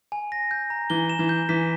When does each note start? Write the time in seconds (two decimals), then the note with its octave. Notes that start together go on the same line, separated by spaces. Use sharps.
0.12 G#5
0.32 A#6
0.51 G6
0.70 A#5
0.90 E3 G7
1.09 E7
1.19 E3
1.29 G6
1.49 E3 B6